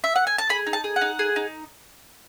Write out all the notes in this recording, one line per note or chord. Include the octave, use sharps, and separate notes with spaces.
E5
F#5
G#5
A5
G#4 B5
D#4
A5
G#4
F#5
D#4
G#4
D#4